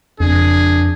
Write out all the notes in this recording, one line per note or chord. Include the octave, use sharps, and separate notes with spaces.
F#1 F2 D4 G#4